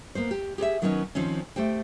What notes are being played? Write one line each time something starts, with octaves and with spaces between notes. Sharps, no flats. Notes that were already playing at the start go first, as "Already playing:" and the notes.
A#3 B3 C5
G4
G4 G#4 B4 E5
D#3 F#3 G3 B3 C#4 D#4
D#3 F3 C4 C#4
A3 G4 C5 G5